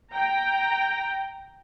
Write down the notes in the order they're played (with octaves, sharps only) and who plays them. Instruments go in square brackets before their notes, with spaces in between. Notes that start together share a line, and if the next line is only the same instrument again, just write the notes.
[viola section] G5 A#5